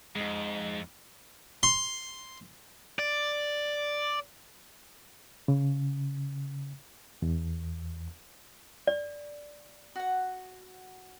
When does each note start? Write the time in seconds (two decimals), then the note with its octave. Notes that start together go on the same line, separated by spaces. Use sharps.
0.16 F2 G#3 D#4
1.63 C6
2.99 D5
5.48 C#3
7.22 E2
8.87 D5
9.96 F#4 F#5